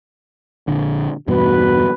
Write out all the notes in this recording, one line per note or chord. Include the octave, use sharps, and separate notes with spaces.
A#1 D3
E2 G2 B2 F#4 B4